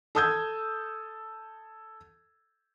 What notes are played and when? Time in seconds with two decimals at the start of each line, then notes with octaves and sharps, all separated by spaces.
0.15 A4 A5 D#6 E6 G6 G#6